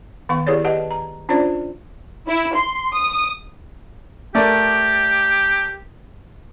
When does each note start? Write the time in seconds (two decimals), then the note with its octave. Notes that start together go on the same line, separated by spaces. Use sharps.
0.29 D#3 B3 F5 C#6
0.47 E4 G4 G#4 B4 C#5 D5
0.64 G4 B4 D#5 F#5 A5
0.91 A#5
1.29 C#4 D4 F4 C5 D5
2.28 E4
2.56 C6
2.94 D#6
4.35 A3 G4 A#4 D5